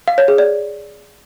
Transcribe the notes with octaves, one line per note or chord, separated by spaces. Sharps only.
F5
C#5
G#4
D5